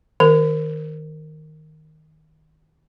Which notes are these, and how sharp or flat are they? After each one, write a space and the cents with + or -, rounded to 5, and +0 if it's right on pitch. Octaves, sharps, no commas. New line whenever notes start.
D#3 +0 A#4 -10